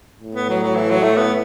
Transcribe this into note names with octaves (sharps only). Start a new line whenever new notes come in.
A2
B3
F#3
F#3
E3
F#3
A3
B3